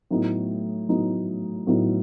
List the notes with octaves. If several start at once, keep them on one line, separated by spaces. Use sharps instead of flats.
A2 F#3 B3 D#4
A2 F#3 B3 D#4
A2 F#3 B3 D#4